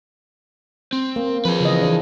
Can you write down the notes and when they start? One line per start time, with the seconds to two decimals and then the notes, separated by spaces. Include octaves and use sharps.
0.93 C4
1.16 A#3
1.45 F3 G#4 B4
1.60 C#3 E3 D#5
1.82 E3 D4